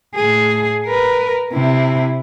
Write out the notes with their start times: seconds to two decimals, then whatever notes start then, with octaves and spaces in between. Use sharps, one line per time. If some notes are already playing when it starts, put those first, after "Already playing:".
0.15 A2 G#4
0.87 A#4 B4
1.52 C3 E4